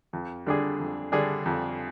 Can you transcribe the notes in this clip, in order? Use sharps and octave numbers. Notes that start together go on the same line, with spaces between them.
F2
D3 G3 D4 G#4
F2
D3 G3 D4 G#4
F2